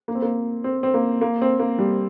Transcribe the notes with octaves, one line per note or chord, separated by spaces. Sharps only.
A#3
C4
A#3
C4
C4
A#3
A#3
C4
A#3
G3